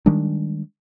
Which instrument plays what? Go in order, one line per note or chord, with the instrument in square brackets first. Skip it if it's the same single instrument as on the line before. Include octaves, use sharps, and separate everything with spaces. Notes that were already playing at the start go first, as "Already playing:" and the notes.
[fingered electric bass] D#3 G3 G#3 D4